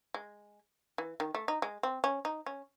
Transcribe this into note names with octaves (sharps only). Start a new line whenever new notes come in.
G#3
E3
D#3
A3
D#4
G#3
C4
C#4
D#4
C#4